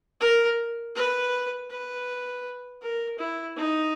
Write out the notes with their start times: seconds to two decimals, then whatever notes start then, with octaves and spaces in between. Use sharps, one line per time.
0.21 A#4
0.95 B4
1.70 B4
2.81 A#4
3.18 E4
3.56 D#4